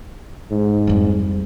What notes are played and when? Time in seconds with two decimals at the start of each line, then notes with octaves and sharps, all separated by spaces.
0.51 G#2
0.87 F2 G3